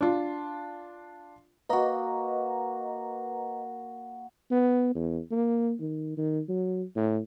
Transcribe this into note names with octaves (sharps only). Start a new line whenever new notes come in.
D4 F4
A#3 F#4 B4 D#5 A#5
B3
E2
A#3
D#3
D#3
F#3
A2